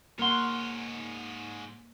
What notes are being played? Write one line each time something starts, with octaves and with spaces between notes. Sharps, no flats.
G#2 A#3 A#4 C#5 F#5 C6